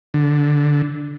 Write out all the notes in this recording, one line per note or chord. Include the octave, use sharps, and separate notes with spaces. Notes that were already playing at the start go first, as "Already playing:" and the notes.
D3